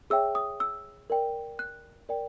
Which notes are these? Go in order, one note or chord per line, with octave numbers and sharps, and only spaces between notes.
G#4 C#5 E5 G5 E6
D#6
E6
A#4 D5 G5
F#6
A#4 D5 G5